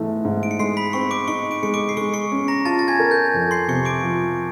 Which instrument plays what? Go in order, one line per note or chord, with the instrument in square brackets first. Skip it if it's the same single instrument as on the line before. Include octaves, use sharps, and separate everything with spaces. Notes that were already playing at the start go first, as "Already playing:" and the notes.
Already playing: [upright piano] G#2 E3 A3
G#2
[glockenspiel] D7
C#7
[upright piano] G#3 [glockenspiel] C6 C7
[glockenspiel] B5 B6
[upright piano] C4 [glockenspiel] C#6 C#7
[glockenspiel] D6 D7
[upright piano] D#4 [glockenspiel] C#6 C#7
[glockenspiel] D6 D7
[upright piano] G#3 [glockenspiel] C#7
[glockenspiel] D6 D7
C7
[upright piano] G#3 [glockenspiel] C#6 C#7
[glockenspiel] C#6 C#7
[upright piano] C#4
[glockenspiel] A#5 A#6
[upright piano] F4 [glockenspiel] A5 A6
[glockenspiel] A6
G#5 G#6
[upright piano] A#4
[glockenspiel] G6
[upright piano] F2
[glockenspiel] C6 C7
[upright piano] C3 [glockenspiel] C#6 C#7
[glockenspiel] D6 D7
[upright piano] F3